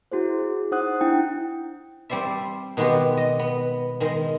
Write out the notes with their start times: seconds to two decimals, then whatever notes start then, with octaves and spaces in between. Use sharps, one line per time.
0.12 E4 F#4 G#4 C5
0.38 G#4
0.72 D#4 C5 F#5 D#6 F#6
1.01 D4 E4 G5
2.10 G3 C4 C5 D5 E5
2.77 B2 D#3 G#3 B3 F#4 G4
3.17 D#5
3.39 B3
4.00 D#3 G#3 D#5